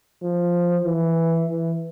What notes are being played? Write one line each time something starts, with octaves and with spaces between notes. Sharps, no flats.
F3
E3
E3